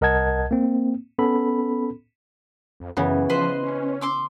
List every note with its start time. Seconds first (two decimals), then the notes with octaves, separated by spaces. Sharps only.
0.01 C2 A#4 D#5 F#5 A5 G#6
0.51 A#3 C4
1.19 B3 C#4 A4 B5
2.80 F2
2.97 F#2 C#3 E3 B3
3.30 F3 B4 C5 D#5
3.63 C#4
4.01 C6 D6 E6